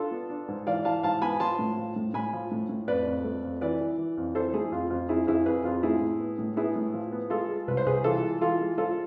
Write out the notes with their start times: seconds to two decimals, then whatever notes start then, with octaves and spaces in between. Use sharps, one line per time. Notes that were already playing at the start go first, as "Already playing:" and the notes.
Already playing: D4 F4 A4
0.11 B3
0.30 D4
0.48 G#2
0.67 E3 D5 F5
0.85 E3 F5 A5
1.03 G#2 F5 A5
1.22 B3 G#5 B5
1.40 F3 A5 C6
1.59 A2
1.77 F3
1.96 A2
2.14 A2 G#5 B5
2.33 F3
2.51 A2
2.69 A2
2.88 F2 B4 D5
3.06 F2
3.24 A3
3.43 F2
3.61 E3 B4 D5
3.81 E3
3.98 E3
4.17 F2
4.35 E3 A4 C5
4.54 A3 E4 G#4
4.72 F2 F4
4.90 F2 F4
5.09 F2 E4 G#4
5.27 F2 E4 G#4
5.46 F2 G#4 B4
5.64 F2 F4
5.83 A2 E4 G#4
6.01 A2
6.19 B3
6.39 A2
6.56 B3 E4 G#4
6.76 A2
6.93 F3
7.12 B3
7.30 G#3 F4 A4
7.49 G#3
7.67 C2 B4
7.77 C5
7.86 C2 G#4 B4
8.04 E3 F4 A4
8.23 G#3
8.41 E3 F4 A4
8.60 G#3
8.78 F3 F4 A4